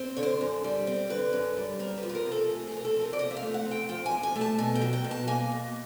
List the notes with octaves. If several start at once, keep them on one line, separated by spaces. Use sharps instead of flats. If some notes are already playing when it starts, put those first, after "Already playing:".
Already playing: C4
D3 C#5
C5
F#2
G3
C4
D3 B4
F#2
G3
C4 A#4
B4
F3
B4
A#4
C3
A4
A3 G#4
G#4
C4 A#4
A4
F3
A#4
D5
C3 D#5
E5
F5
A3
F#5
C4
G5
F3 G5
G#5
C3
G#5
A3
A5
B2 G#5
G5
F#3
G5
B2
A5
A#3 G#5
B2